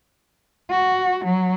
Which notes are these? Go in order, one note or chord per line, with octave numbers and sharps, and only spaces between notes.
F#4
F#3